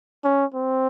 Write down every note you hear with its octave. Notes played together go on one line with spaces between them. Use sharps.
C#4
C4